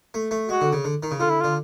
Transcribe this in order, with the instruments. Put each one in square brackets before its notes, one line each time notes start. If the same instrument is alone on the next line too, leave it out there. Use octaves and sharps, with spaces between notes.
[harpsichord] A3
A3
[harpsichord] G#3 [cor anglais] F#4
[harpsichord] D3
C#3
D3
D#3
C#3
[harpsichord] D3 [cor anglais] F4
[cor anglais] E4
[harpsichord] D3 [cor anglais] F4